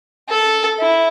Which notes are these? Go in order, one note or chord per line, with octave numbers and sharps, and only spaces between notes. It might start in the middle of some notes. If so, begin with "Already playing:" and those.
A4
E4